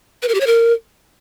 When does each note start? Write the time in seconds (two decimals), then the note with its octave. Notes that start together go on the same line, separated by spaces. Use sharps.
0.22 B4
0.28 A#4
0.34 G4
0.41 C#5
0.47 A#4